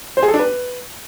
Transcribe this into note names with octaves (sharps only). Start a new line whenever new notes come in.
C5
G#4
A4
D4
B4